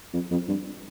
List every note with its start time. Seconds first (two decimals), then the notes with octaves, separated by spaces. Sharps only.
0.13 F2
0.31 F2
0.48 G2